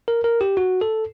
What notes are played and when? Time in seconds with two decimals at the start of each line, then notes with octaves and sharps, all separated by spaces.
0.08 A#4
0.24 A#4
0.41 G4
0.57 F#4
0.81 A4